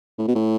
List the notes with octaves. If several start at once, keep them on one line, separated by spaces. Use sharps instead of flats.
A2
B2
A2